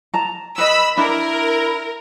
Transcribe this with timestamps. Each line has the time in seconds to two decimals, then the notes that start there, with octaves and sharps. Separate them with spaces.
0.14 A5 A#5
0.58 B4 D#5 B5 E6
0.98 D4 E4 A#4